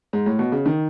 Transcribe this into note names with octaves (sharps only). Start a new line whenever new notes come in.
G#2
A2
B2
C#3
D#3